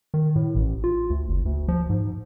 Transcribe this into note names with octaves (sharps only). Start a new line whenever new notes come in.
D#3
A2
A1
F4
D2
F#1
D2
F3
G#2